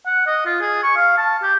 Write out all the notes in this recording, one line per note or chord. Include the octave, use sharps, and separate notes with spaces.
F#5
D#5
F4
G#4
C#6
F5
A5
G4